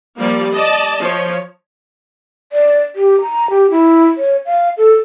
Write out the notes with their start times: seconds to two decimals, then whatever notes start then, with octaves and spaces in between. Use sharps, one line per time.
0.18 F3 G3 A#3 D5
0.53 D5 D#5 A5
0.99 F3 C#5
2.53 D5
2.96 G4
3.21 A#5
3.50 G4
3.71 E4
4.18 C#5
4.46 F5
4.78 A4